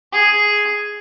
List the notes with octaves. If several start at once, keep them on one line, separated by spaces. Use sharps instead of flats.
G#4